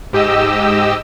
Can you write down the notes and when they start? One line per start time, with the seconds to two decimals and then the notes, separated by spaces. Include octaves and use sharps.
0.13 G#2 G4 D#5 E6